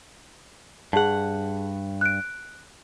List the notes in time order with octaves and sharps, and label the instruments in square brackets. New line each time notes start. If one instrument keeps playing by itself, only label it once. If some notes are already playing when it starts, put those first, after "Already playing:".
[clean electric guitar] G2 F#5 [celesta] G#4 A5
[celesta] F#6 D7